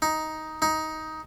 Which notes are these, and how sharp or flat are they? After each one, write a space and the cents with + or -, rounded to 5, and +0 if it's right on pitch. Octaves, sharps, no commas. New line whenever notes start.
D#4 +10
D#4 +15